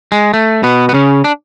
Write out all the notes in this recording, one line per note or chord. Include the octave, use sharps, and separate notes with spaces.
G#3
A3
B2 B3
B3
C#3 C#4
D4